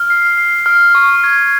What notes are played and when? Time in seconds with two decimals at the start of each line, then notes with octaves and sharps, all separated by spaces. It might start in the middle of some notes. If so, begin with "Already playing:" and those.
Already playing: F6
0.10 C7
0.38 C7
0.66 F6
0.95 C#6
1.24 G#6